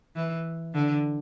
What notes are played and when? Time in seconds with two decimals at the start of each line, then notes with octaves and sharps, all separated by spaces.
0.16 E3
0.74 D3